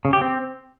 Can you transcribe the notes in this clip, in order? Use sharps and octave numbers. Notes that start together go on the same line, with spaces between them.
C#3
G4
C4